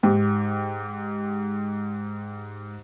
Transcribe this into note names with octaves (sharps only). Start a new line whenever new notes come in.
G#2 G4